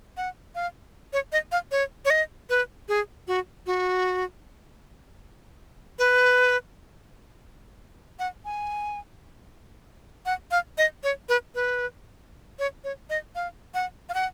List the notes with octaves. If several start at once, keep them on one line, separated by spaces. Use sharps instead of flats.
F#5
F5
C#5
D#5
F5
C#5
C#5
D#5
B4
G#4
F#4
F#4
B4
F#5
G#5
F#5
F5
D#5
C#5
B4
B4
C#5
C#5
D#5
F5
F#5
F5
F#5